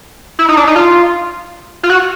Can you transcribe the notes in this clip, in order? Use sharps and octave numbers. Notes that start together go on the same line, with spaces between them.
E4
D#4
D4
D#4
F4
F4
F#4